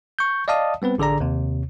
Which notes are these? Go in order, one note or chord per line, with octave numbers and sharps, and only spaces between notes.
C#6 G6
D5 D#5 F5 A5 D#6
G3 B3 C4 B4
A1 D3 G#4 D5 A#5
D#2 C3